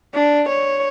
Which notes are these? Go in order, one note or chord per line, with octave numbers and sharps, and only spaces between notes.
D4
C#5